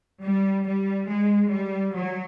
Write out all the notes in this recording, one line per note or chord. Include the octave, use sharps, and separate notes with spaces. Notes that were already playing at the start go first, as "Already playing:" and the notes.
G3
G3
G#3
G3
F#3